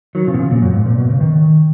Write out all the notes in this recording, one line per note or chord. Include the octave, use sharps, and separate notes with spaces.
D#3 F#3
C#3 F3
B2
C#3
A#2
F#2
G#2
A#2
B2
C#3
D#3